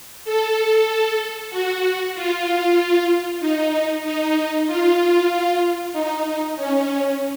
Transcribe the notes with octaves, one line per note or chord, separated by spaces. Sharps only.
A4
F#4
F4
D#4
D#4
F4
D#4
C#4